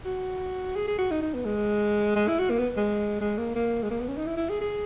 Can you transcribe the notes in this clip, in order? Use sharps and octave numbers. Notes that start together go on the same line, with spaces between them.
F#4
G#4
G#4
F#4
D#4
D#4
B3
G#3
G#3
E4
F#4
A#3
B3
G#3
G#3
A#3
A#3
G#3
A#3
B3
C#4
D#4
E4
E4
G#4
G#4